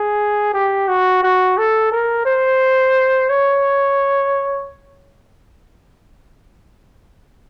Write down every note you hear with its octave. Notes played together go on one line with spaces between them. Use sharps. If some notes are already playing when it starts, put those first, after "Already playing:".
Already playing: G#4
G4
F#4
F#4
A4
A#4
C5
C#5